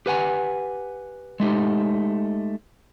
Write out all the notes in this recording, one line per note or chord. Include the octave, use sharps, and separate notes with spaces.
G4 B4 F#5 G#5
G#3 A3 D#4 G4